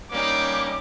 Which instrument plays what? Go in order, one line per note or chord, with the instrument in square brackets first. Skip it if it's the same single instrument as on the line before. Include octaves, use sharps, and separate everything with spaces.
[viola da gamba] G3 [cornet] A#3 [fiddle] C#4 D#4 [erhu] D6